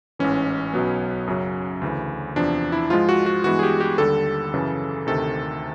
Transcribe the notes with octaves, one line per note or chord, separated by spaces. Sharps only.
A1 G#2 E3 C#4
B1 B2 F#3 B3
F#2 C#3 F#3
D2 C#3 E3
E2 C3 F3 D4
E4
G#2 F3 G#3 F4
F#4
F#4
G2 E3 G#3 B3 F#4
G#4
G4
G4
D#2 D3 G3 A4
F#2 C#3 E3
D2 C3 D#3 A4